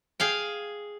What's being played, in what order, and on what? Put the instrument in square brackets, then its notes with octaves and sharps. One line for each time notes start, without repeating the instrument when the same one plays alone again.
[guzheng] G#4 F5 G5